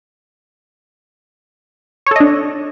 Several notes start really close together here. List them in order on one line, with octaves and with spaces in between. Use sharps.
C#5 A4 D#5 D4